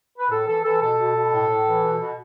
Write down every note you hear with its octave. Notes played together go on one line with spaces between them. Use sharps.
B4
A2 A4
E3 A4
E3 A4
B2 A4
B2
B2
A2
A2
E3
B2
B2